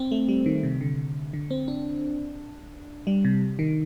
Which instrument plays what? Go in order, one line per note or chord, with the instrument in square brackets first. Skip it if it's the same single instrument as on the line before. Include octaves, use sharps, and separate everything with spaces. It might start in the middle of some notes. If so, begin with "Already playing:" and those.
Already playing: [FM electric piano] C4
A3
G3
D#3
C3
D3
D3
C4
D4
G3
C3
D#3